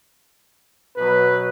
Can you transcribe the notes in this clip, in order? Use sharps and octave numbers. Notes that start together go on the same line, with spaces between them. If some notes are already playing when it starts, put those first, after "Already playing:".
B2 F#3 B4